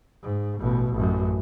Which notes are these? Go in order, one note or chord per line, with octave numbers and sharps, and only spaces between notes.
G#2
A1 B2
A1 F#2